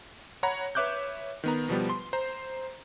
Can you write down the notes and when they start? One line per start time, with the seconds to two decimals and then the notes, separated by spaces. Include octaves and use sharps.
0.43 C#5 F#5 A#5 B5
0.75 B4 C#5 E5 D6 F#6 G6
1.44 D#3 B3 A#5
1.69 B2 F3 G3 B3
1.90 C6
2.13 C5 A#5